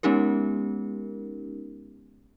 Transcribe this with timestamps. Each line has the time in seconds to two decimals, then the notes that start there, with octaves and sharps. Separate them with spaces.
0.03 G#3 B3 C#4 D#4 G4 A#4